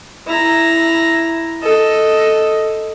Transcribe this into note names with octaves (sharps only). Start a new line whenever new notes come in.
E4 A#5
A4 D#5